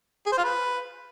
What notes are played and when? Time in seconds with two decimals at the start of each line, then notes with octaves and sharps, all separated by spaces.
0.27 G#4
0.32 C5
0.38 F4
0.44 B4